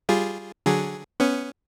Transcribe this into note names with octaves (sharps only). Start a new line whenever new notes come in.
G3 F4 G#4
D3 F#3 G#4
B3 C#4